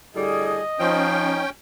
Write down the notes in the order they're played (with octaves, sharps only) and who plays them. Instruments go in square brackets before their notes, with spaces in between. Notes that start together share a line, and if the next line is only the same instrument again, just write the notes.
[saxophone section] A2 D3 G3 [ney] G#4 [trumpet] D#5
[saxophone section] F3 [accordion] C#4 G5 [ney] D#4